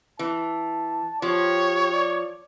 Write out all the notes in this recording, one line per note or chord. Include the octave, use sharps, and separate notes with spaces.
E3 A5
F3 G4 C#5
D5